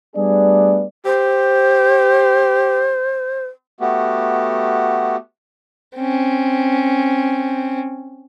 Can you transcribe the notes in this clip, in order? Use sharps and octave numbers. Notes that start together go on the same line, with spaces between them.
G3 A3 B3 D4 G#4 D5
G4 C5
A3 B3 F#4 G4
C4 C#4